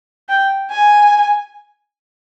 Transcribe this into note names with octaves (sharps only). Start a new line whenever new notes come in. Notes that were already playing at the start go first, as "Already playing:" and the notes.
G5
G#5